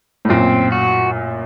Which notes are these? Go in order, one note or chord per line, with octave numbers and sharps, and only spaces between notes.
A2
F#2 A#2 C4
F#4